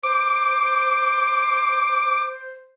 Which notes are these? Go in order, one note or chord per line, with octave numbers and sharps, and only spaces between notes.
C5 D6